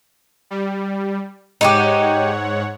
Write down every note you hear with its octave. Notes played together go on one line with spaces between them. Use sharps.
G3
G#2 D#4 F4 G4 C#5 F#5